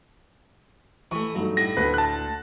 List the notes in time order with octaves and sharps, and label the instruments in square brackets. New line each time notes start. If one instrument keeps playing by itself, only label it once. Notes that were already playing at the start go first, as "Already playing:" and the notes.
[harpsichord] E3 A3 [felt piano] C#6
[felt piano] G2 A3 D#4 [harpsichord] F#3
[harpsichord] A2 F#4 [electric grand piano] A#6
[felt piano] D2 [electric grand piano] B4
[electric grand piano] A5 F#6